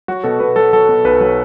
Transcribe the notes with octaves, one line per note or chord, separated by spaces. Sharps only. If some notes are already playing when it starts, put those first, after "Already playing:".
F#3 F#4
B2 A4
B2 B4
F#3 A4
F#3 A4
B2
B1 B4
F#3